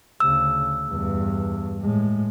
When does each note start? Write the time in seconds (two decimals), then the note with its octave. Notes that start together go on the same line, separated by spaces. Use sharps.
0.20 D2 C#3 E6
0.90 E2 G2
1.80 A2 G#3